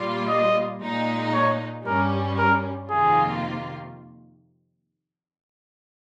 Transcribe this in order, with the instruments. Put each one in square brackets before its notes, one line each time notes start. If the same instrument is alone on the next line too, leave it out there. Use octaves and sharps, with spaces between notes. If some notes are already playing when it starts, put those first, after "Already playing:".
Already playing: [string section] A#2 G3 A#3 F4
[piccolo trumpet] D#5
[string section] A#2 G#3 D#4
[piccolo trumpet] C#5
[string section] G2 G3 C#4 [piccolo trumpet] A#4
[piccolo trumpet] A#4
[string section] F2 C3 D#3 A#3 F4 [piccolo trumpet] G#4